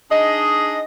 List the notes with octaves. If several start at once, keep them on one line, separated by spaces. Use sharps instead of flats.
D4 D#4 G#4 D#5